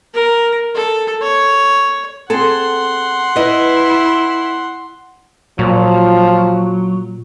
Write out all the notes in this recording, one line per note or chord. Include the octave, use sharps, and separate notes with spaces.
A#4
A4
C#5
C4 G#4 A4 F#5 C6
E4 B4 D#5
A#2 F3 F#3